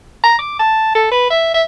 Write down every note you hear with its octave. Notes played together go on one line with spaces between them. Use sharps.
A#5
D6
A5
A4
B4
E5
E5